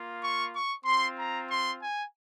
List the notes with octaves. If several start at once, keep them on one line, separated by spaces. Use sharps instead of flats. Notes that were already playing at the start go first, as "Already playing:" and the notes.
Already playing: A#3 F4
C#6
C#6
C4 F4 C6
A#5
C6
G#5